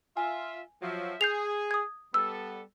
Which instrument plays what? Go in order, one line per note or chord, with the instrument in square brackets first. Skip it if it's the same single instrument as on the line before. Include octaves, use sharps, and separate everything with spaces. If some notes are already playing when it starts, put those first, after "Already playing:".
[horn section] F4 E5 [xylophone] G#5
[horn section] F3 F#3 E5
[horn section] G#4 [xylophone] G6 C7 F7
[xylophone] D#6 G#6
[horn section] G3 B3 A4 [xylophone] E6